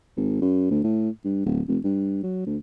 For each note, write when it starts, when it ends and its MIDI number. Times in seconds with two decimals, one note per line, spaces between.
0.17 0.41 32
0.42 0.67 42
0.71 0.79 38
0.84 1.09 45
1.25 1.43 43
1.45 1.61 26
1.68 1.78 29
1.84 2.21 43
2.23 2.43 54
2.46 2.57 38